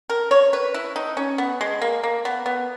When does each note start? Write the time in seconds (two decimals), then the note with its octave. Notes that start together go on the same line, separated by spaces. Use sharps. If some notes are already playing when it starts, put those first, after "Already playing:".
0.10 A#4
0.31 C#5
0.53 B4
0.74 E4
0.96 D#4
1.17 C#4
1.38 B3
1.61 G#3
1.81 A#3
2.03 A#3
2.25 B3
2.46 B3